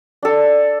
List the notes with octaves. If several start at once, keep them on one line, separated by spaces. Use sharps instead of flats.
D4 A4